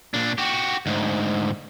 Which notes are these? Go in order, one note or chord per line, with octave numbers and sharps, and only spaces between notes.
A#2 D4
F#4 G4
D2 G#2